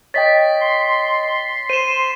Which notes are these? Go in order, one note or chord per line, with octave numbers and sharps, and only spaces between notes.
C#5 D#5 G5 A6 B6
C6
C5 D#7 E7